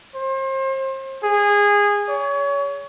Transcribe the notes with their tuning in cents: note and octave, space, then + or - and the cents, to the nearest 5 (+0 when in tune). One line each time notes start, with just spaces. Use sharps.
C5 +35
G#4 -20
C#5 +30